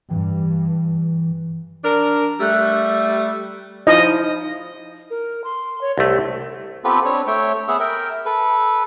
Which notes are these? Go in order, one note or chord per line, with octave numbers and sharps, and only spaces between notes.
G2 E3
D4 A#4
G3 A3 E6 F#6
F3 D#4 E4 C5 D#5
A#4
C6
C#5
C2 A3 G4
B3 C4 F4 G4 A4 B4
C4 D4 C#5
A3 C#5 E5 G5
B3 G#4 E5 F#5 E6
A#4 E5 G5
A4 B4